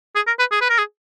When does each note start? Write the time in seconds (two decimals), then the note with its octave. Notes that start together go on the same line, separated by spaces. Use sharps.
0.16 G#4
0.27 A#4
0.39 B4
0.52 G#4
0.61 B4
0.70 A#4
0.78 G#4